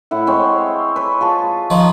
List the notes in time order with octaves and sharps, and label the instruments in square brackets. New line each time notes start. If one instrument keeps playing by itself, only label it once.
[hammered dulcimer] A2 E4 F#5
G#3 C4 C#5
B4 C#5
F4 G#4 A5
[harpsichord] D#3 F3